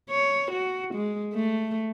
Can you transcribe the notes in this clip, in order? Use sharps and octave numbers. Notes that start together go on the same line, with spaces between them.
C#5
F#4
G#3
A3